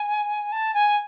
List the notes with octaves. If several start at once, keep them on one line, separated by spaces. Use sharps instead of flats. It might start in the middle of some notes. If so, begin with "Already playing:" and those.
Already playing: G#5
A5
G#5